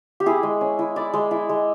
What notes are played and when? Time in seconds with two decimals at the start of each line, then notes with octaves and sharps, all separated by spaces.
0.20 G4
0.26 E4 G#4
0.43 G#3
0.61 C#4
0.79 E4
0.96 E4 D5
1.14 G#3
1.31 E4
1.49 G#3